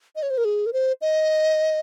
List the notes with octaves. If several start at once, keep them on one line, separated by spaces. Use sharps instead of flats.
D#5
C#5
C5
A#4
G#4
A#4
C5
D#5